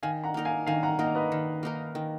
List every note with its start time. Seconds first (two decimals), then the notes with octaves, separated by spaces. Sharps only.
0.03 D#3 F5 G#5
0.24 F#5 A#5
0.34 A#3 D#4 A#4
0.45 F5 G#5
0.67 D#3 F5 G#5
0.83 F#5 A#5
0.98 A#3 D#4 A#4 D#5 F#5
1.15 B4 D#5
1.32 D#3
1.63 A#3 D#4 A#4
1.95 D#3